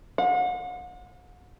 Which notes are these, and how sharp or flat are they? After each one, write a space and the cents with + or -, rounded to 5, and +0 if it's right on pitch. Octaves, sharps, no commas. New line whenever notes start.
F#5 -40